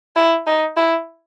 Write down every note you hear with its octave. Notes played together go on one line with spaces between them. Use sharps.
E4
D#4
E4